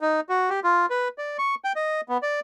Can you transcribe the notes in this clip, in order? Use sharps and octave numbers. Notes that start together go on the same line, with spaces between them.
D#4
F#4
G4
F4
B4
D5
C#6
G5
D#5
B3
D5